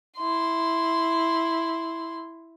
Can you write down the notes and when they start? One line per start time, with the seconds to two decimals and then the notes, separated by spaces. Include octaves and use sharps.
0.17 E4 C6